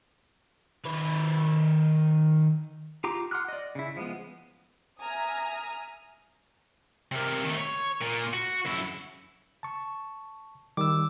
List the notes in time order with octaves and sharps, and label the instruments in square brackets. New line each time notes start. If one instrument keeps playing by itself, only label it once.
[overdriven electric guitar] D#3 B4
[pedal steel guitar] F4 G4 A#5 D6
F#5 C6 D6 F6 F#6
D5 D#5
C#3 E4
F3 G#3 B3
[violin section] E5 G#5 A#5 D#6 F6
[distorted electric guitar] C3 A#3
D#3 A3
C#5
A#2
F#4
F#2 E4
[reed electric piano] A5 C#6
[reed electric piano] D#3 G3 [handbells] D6 E6